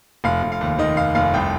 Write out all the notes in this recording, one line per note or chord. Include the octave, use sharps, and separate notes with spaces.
F1 F5
F1
F5
D#2
D#3 D#5
F1 F5
F1 F5
C2 G5